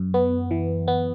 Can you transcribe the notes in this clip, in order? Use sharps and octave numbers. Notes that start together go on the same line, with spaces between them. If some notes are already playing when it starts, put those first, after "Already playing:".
Already playing: F#2
B3
E3
B3